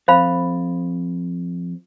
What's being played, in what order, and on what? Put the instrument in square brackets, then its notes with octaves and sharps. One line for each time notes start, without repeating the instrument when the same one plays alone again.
[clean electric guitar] F2 [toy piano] C5 F5 B5